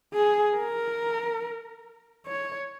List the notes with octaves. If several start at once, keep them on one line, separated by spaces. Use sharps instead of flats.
G#4
A#4
C#5